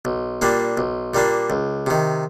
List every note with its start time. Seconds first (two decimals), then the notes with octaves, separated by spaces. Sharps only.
0.05 B1
0.42 A#2 G3 A#3 D4
0.77 B1
1.14 A#2 G3 A#3 D4
1.50 C#2
1.86 C3 D#3